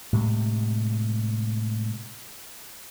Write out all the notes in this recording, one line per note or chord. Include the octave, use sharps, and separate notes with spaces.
A2 C3 G#3